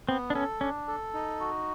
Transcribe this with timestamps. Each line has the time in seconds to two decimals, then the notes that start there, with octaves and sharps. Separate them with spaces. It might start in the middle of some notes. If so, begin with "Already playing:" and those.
0.09 B3 C4
0.30 D4
0.34 C#4 A4
0.61 C#4 D4
0.88 A4
1.14 D#4
1.40 F#4